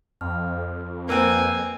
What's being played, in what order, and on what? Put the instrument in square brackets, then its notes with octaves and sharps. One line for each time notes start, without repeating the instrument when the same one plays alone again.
[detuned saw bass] F2 [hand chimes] F6
[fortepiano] A#3 C4 [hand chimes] B4 E6 F#6 [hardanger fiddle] G#5